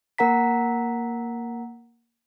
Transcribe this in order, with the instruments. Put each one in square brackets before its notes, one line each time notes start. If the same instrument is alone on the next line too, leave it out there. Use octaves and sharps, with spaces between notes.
[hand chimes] A#3 A#4 F#5 A#5 B6